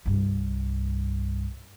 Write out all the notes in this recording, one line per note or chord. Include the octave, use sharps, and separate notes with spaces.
C2 G2